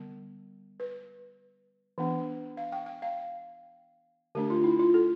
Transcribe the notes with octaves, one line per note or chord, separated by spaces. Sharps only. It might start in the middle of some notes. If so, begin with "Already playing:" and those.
Already playing: D3 G3 B3
B4
E3 B3 D4
F5
G5
G5
F5
D3 A3 D4 G4
F4
E4
F4
A4